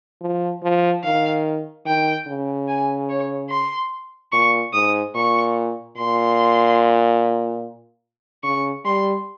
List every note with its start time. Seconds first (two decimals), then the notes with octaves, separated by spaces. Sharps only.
0.21 F3
0.63 F3
1.04 D#3 F5
1.86 D#3 G5
2.27 C#3
2.68 G#5
3.09 C#5
3.50 C6
4.32 A#2 C#6
4.73 G#2 D#6
5.15 A#2 C#6
5.97 A#2 C6
8.44 C#3 C#6
8.85 G3 C6